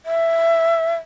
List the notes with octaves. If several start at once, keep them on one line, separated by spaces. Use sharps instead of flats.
E5